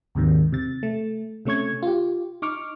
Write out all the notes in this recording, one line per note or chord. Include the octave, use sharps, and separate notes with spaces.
D#2 G#2 C3 D#3
C3 A6
A3
C3 A3 C#4 C#6 G#6
F4 G4
D#4 C#6 D6 F6